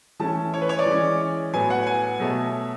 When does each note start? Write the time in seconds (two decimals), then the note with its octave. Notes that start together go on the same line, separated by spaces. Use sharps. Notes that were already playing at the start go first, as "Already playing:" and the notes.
0.20 E3 A3 C#4 A5
0.54 C#5
0.61 B4
0.69 C#5
0.79 D5
0.86 E3 G#3 C#4
1.53 A2 F#3 B3 G#5
1.70 F#5
1.87 G#5
2.19 B2 F#3 A3